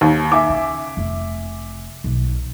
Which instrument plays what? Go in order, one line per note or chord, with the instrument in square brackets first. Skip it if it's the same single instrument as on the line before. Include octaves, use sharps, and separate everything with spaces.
[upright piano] D#2
E5 G#5 D6
[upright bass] C#3
F1
B1